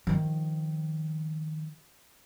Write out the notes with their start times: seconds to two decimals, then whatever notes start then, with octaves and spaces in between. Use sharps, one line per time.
0.07 D#3 F3